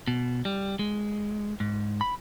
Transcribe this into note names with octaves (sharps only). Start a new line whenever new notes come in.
B2
G3
G#3
G#2
B5